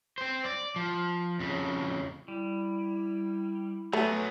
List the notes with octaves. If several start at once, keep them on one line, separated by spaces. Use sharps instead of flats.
C4 C5
D5
F3
F2 C#3
G3 E4
F#3 A3 B3 G#4